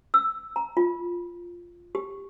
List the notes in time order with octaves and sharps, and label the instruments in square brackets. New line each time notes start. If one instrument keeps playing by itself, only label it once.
[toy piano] E6
A#5
F4
G4